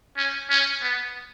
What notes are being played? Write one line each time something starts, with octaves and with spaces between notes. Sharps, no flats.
C#4
C#4
B3